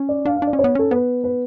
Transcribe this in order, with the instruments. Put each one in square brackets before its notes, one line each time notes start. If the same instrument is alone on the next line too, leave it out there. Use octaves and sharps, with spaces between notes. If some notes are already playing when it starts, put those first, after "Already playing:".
Already playing: [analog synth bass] C#4
[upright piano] D5
[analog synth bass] D4 [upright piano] F5
[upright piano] F5
[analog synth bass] D4
[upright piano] D5
[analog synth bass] C#4
[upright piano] C#5
[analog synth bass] B3
[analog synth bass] C#4 [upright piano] A4
[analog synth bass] B3 [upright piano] B4
[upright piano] B4